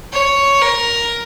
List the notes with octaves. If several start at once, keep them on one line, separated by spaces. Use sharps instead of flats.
C#5
A#4